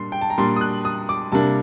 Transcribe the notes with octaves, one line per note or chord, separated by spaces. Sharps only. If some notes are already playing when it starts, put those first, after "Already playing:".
Already playing: A#2 G3 D4 C6
G5
A5
A#5
A#2 G3 D4 C6
D#6
F#6
D#6
D6
C3 G3 A#3 D4 A5